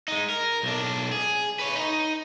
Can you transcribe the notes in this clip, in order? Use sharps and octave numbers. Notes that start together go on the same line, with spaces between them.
G#3 D#4
A#4
B1 D4
G#4
B4 C#5
D#4